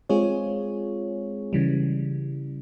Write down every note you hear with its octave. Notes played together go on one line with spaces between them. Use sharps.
G#3 C4 F4 G#4 C#5
C#3 E3 G3